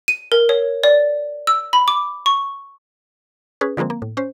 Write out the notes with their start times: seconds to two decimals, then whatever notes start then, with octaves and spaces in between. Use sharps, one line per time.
0.08 D#7
0.32 A#4
0.49 C#5
0.84 D5
1.47 E6
1.73 B5
1.88 D6
2.26 C#6
3.61 C#4 G#4 B4
3.77 D3 F3 G#3 A#3 C4
3.90 A#3
4.02 A2
4.17 C#4 C5